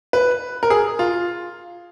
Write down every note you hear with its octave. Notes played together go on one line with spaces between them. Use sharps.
B4
A#4
G#4
F4